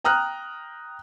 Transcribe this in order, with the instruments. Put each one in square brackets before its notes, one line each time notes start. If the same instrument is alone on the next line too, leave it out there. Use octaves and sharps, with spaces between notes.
[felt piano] G5 A#5 D#6 F6 F#6